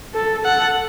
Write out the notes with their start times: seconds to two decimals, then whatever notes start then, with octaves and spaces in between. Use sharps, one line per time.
0.14 A4
0.45 A4 F#5